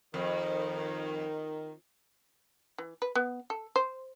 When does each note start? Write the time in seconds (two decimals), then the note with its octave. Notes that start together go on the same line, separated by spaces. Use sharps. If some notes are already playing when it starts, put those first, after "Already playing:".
0.14 F2 D#3
2.78 E3
3.02 B4
3.15 B3
3.50 A4
3.76 C5